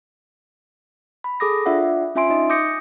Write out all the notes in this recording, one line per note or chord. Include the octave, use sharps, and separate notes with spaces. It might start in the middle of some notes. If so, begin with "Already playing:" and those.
B5
G#4 A4 B5 D6 D#6 A#6
D4 F4 D5 E5 F#5
C#4 F4 E5 G#5 C6 D7
D#4 D#5
D6 D#6 G6 A#6 C#7